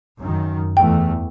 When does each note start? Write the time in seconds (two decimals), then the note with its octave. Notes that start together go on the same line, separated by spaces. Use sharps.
0.21 F#2 D#3
0.77 E2 A3 G5